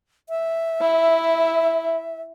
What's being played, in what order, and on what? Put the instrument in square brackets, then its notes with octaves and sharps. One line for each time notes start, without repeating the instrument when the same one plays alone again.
[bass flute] E5
[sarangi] E4